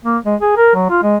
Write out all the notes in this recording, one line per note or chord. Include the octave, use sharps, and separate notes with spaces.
A#3
G#3
G#4
A#4
F#3
F4
G#3